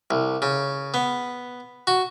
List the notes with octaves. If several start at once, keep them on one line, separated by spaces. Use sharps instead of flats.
C2
C#3
B3
F#4